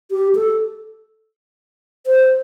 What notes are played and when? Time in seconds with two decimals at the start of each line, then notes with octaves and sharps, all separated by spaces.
0.11 G4
0.35 A4
2.06 C5